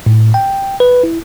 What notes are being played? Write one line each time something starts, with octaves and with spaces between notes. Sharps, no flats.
A2
G5
B4
E4